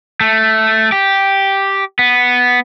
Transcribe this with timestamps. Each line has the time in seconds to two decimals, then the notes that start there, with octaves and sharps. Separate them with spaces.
0.21 A3
0.92 G4
1.99 B3